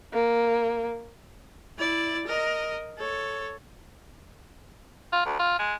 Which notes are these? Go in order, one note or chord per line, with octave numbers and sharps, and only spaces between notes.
A#3
E4 D5
A#4 D#5
A4 C#5
F4
D2
F4
G#3